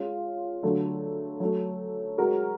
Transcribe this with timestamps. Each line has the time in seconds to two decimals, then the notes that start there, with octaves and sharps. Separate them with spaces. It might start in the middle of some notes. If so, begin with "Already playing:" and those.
Already playing: G#3 C#4 F4
0.63 D3 F#3 A3
1.40 F#3 A3 C#4
2.18 G#3 C#4 F#4 A#4